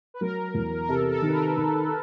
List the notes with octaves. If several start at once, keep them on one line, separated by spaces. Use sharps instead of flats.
B4
F#3 A#4
E2
A#4
C3 A4
A4
D#3 B4
A#4
D#3